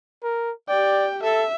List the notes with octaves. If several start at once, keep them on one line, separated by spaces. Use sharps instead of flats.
A#4
G4 D5 G5
A4 E5